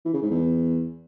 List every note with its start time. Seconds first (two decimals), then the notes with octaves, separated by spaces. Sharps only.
0.05 E3
0.14 C#3
0.22 G#2
0.31 E2